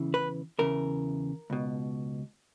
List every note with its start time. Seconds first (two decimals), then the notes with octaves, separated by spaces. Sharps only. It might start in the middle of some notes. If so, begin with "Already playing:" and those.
Already playing: E2 C#3 E3
0.14 B4
0.59 E2 C#3 E3 A#4
1.50 C#2 B2